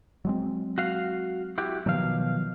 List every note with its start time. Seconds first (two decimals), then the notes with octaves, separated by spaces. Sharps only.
0.25 F#3 G#3 C4
0.78 F#4 F5
1.58 E4 F#4 G4
1.86 B2 D#3 F3 F#3 F5